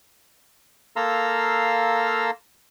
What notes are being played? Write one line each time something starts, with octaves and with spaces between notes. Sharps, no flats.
A#3 A4 F5 A#5 C6 E6